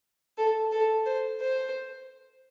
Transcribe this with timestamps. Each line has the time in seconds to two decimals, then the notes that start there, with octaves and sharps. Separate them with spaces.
0.38 A4
0.72 A4
1.06 C5
1.40 C5